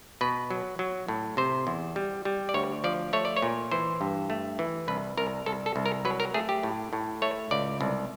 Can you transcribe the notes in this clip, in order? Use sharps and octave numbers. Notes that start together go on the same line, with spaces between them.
B2 B4
F#3
F#3
A2
C3 C5
E2
G3
G3
D5
D2 C#5
F3 D5
A3 C#5
D5
C#5
A#2
E3 C5
G2
A3
E3
C2 B4
C2 A#4
C2 A4
A4
C2
A#4
F#3 B4
A#4
A3 G#4
G4
A2
A2
A3 C#5
C#2 D5
C2